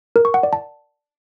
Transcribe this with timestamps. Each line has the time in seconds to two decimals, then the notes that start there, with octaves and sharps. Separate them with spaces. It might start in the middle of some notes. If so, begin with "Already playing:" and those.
0.16 A#4
0.25 C#6
0.34 F#5
0.43 D5
0.53 A5